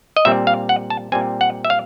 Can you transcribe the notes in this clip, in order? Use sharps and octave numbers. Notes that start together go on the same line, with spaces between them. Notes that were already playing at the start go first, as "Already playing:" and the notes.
D#5
A#2 G3 C4 E5
F5
F#5
A5
A#2 G3 C4 G#5
F#5
E5
F5